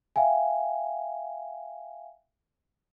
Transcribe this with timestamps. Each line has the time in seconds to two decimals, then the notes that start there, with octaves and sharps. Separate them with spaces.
0.16 E5 F5 G5 G#5